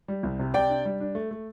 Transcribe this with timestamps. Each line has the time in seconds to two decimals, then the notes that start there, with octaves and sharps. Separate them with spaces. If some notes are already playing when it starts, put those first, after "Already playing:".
0.08 G3
0.23 C2
0.39 C3
0.54 C3 D5 G5
0.69 D4
0.85 G3
1.00 D4
1.15 A3
1.31 A3